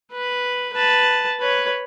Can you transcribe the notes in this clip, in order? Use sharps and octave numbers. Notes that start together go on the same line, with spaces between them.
B4
B4 A5
B4 C#5